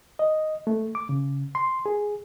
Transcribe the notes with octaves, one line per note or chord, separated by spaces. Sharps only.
D#5
A3
D6
C#3
C6
G#4